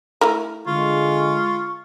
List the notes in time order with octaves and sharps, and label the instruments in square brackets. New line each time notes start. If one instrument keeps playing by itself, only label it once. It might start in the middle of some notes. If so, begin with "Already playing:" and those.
[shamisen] A3 E4 A#4
[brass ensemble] D3 G#3 [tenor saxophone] F4 [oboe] C#6